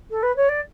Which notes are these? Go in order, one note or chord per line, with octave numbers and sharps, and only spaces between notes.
A4
B4
C#5
D5